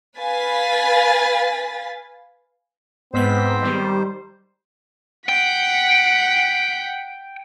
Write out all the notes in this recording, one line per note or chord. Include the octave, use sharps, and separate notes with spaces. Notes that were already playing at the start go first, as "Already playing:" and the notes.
B4 F5 G#5 A6 B6
G#2 B3 C4 C5 B6
D#3 G3
F#5 G5 B6